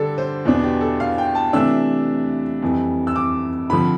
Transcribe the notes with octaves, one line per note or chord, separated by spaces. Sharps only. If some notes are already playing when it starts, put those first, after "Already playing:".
Already playing: D3 G3 D4 A4
C5
E2 B2 B3 D4
G4
A4
F5
G5
A5
C3 E3 A3 D4 E6
F2 E3 G3
E6
D6
D3 F3 C4 B5